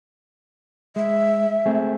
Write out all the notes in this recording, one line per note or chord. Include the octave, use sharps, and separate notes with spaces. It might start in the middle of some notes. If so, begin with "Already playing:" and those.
G#3 E5
A3 C4 G#4